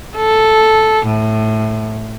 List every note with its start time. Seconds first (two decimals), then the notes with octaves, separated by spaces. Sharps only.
0.17 A4
1.07 A2